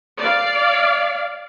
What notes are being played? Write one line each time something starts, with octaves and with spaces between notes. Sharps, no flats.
D5 F5